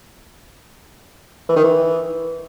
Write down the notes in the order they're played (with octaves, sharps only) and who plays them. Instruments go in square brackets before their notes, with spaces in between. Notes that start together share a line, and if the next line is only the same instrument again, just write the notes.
[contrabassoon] E3
D#3
E3